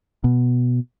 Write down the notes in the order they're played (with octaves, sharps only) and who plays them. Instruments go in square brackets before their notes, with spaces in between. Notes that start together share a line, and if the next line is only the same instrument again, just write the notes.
[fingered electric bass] B2